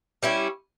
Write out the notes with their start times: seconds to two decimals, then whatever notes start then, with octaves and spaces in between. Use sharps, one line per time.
0.23 G3 C#4 E4